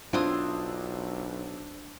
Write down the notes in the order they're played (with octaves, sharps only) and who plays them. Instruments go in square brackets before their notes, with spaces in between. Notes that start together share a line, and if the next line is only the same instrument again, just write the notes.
[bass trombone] B1 [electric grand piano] C4 D4 [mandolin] E4 C5 D#6 [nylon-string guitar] F4